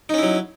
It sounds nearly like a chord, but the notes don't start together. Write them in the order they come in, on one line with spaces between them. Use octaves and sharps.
D#4 C#4 E4 F#3